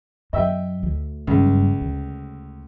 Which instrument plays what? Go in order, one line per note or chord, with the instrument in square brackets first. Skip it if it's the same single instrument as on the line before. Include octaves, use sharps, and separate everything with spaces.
[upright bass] F#2 [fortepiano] D#5 E5 G5
[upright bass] D2
[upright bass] F#1 G2 [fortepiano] C#2
[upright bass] D2